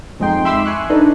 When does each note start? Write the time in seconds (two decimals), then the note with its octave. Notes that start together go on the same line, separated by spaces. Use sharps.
0.20 F2 G#3 D#4 G5 C6
0.45 E5 B5 C6 D6 E6
0.65 G#5 C#6 F#6
0.90 D4 D#4 A4 B4